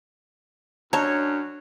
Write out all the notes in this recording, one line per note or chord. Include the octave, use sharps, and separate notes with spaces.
F#2 D4 C#5 D#5 A5 A#5